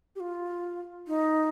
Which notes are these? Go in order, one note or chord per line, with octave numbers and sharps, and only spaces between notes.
G4
F4
D#4